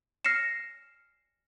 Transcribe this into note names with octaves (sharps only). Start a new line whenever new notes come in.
F6 A#6 C7 C#7 E7